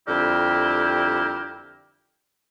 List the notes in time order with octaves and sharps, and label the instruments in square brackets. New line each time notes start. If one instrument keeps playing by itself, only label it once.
[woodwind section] F2 D3 G3 E4 G4 A#4